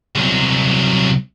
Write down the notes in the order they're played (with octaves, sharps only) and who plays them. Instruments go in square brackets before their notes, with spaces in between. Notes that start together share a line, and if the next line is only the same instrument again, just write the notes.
[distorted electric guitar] C2 F#3